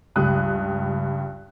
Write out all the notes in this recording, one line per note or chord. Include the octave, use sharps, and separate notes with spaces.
C#2 G2 D#6 F#6